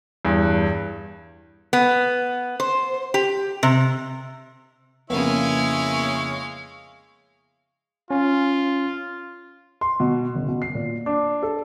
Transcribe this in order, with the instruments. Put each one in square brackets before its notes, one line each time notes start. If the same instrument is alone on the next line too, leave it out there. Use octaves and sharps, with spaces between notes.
[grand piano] E2 G2
[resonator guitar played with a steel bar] B3
C5
G4
C3
[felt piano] F2 C#3 [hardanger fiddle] G#3 F5 [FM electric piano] A#3 B3 [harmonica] E4 C#5
[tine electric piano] C#4 [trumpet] F4
[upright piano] C6
B2
F#1
B2
C7
A#2
D4
A4